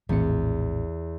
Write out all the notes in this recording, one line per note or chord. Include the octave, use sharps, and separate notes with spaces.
A#1 E2 A2 C4 C#7